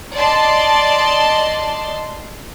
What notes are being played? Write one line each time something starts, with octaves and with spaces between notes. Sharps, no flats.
D5 D#5 A5 C6